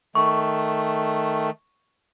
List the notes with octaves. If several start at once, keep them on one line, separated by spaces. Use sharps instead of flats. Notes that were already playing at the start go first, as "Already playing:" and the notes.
D#3 A3 C#6